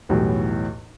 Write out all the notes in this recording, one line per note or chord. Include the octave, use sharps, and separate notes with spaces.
B1 E2 A2 F#3 G3